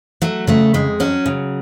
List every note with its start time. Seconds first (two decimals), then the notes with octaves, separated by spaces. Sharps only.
0.22 F#3 A3
0.47 C#3 A3
0.74 F2 G#3
1.00 F#3 C#4
1.26 C#3